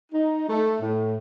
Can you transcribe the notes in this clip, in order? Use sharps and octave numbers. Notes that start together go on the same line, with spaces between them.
D#4
A3
A2